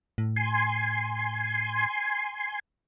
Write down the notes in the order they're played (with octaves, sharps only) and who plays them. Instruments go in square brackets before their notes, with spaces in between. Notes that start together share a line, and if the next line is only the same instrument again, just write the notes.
[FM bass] A2
[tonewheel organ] G#5 C6